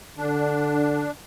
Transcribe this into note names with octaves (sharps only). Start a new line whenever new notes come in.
D3 D4